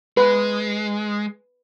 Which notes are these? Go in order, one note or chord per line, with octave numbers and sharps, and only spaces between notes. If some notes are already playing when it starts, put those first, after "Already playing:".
G#3 B4